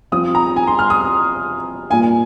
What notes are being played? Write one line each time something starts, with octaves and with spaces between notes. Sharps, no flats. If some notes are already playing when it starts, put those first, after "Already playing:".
F3 C4 F4 D#6
A#5
G#5
C6
F6
D#6
A#2 A#3 F4 G#5